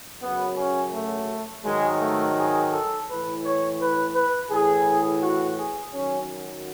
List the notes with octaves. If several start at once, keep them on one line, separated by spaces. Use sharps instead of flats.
F#2 C#3 F#3 B3
C#4
A3
G#2 D#3 F#3 G#3
A3
G#4
A4
A2 E3 B4
C#5
B4
B4
A2 E3 G#4
F#4
G#4
F#2 D#3 F#3 C#4